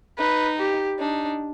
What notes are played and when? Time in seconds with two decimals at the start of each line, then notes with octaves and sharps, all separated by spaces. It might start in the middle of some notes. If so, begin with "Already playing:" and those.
0.19 D#4 B4
0.59 G4
1.00 D4 D#4